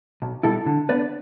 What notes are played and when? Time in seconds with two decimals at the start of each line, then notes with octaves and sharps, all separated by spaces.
0.22 B1
0.43 B2 G3 E4 A4
0.66 D3
0.89 B3 D4 B4 D5